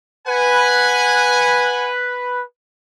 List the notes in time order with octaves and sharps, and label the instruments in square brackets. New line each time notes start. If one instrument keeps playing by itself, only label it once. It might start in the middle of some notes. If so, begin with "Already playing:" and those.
[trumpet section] B4 [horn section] F#5 G#5